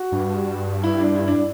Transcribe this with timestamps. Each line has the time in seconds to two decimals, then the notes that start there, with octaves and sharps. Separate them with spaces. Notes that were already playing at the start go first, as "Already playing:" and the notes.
Already playing: F#4
0.12 G2
0.84 E4
1.00 D4
1.16 E4
1.28 D4